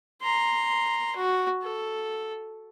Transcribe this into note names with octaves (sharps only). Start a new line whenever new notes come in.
A#5 C6
F#4
A4